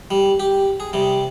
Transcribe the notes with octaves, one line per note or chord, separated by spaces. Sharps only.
G3
G4
G#4
C3 G3